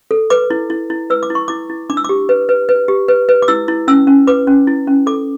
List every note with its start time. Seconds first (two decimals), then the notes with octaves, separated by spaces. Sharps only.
0.11 A4
0.30 B4 D6
0.50 E4
0.70 E4
0.90 E4
1.10 B4 E6
1.23 D6
1.30 E4
1.35 C#6
1.48 E4 D6
1.70 E4
1.90 D4 D6
1.97 E6
2.04 G4 D6
2.29 B4
2.49 B4
2.69 B4
2.88 G4
3.08 B4
3.29 B4
3.42 D6
3.48 E4 E6
3.68 E4
3.88 C#4 E6
4.07 C#4
4.27 B4 D6
4.47 C#4
4.67 E4
4.87 C#4
5.06 A4 D6